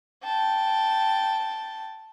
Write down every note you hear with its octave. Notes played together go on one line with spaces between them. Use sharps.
G5 A5